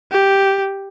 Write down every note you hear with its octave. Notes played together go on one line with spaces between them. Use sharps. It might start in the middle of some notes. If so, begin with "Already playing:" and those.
G4